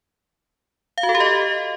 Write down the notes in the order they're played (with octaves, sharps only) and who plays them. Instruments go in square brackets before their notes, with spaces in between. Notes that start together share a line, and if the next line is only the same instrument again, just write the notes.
[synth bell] F5
F#4
A4
G4
D#5